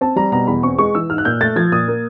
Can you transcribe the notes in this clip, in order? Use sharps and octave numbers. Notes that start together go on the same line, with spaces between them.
C4 A5
G3 A#5
B2 A#5
E2 B5
C4 C#6
G#3 C#6
E3 E6
G#2 F6
F#6
A#2 G6
A3 A6
F3 G#6
A#2 D#6
A#3